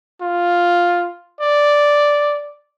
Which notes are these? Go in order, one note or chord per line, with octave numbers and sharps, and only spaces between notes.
F4
D5